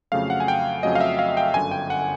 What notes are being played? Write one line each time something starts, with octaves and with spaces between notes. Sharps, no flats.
F2 C#3 F#3 A3 F5
F#5
G#5
G5
F2 C#3 F#3 A3 D#5
F5
E5
F5
G5
G1 F#2 D3 G#5
G5
F#5